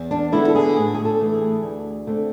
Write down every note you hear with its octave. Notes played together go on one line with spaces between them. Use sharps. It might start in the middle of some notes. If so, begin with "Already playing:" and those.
Already playing: E2
D4
D3 G#3 B3 E4
A4
G#4
A2 G#4
G#4
A4
E3 A3
G#4
D2
D3 A3 C4